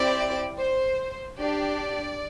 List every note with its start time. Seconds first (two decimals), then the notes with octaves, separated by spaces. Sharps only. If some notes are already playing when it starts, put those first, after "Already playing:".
Already playing: C4 E4 G4 D5
0.58 C5
1.39 D4 G4 D5